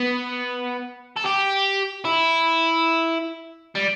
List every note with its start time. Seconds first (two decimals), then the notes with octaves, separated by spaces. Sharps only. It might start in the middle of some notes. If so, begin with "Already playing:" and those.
Already playing: B3
1.16 A4
1.25 G4
2.05 E4
3.75 G3